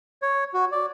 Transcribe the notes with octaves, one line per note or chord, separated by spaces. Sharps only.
C#5
F#4
D5